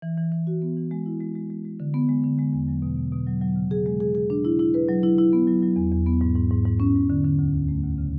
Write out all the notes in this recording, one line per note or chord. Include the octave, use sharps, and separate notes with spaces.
E3
E3
E3
F#4
B3
E3
G#3
E4
G#3
G#3
G#3
G#3
D3
B3
G#3
D3
G#3
E2
F#3
B2
B2
B2
F#3
F#3
C#3
G#4
G#3
G#4
G#4
D4
E4
E4
B4
F#3
E4
E4
B3
F#3
F#3
E2
E2
B3
G#2
G#2
G#2
G#2
C#4
G#2
D3
D3
D2
D2
A3
D2
C#3